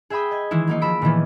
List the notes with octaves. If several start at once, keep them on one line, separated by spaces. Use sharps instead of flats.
G#4 E5 G5 B5 D#6
D#5 G#6
D#3 E3 G#3 E4
F#3 A#3 D#4
F3 B5 E6 D7
A#2 D#3 E3 B3